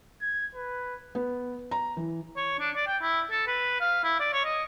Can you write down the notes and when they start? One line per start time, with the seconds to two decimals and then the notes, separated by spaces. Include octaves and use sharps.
0.22 G#6
0.55 B4
1.15 B3
1.71 A#5
1.97 E3
2.37 C#5
2.59 D4
2.76 D5
2.87 G5
3.02 E4
3.31 A4
3.47 B4
3.81 F5
4.04 E4
4.20 D5
4.33 C#5
4.45 D#5